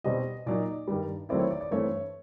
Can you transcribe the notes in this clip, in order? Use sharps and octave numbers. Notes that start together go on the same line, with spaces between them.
B2 G3 C4 D#5
A#2 F#3 A#3 D#4 D5
G2 D#3 G3
D#3 F#3 A3 C4 E4 D5
C#5
D5
D5
G2 E3 A3 C4 C#5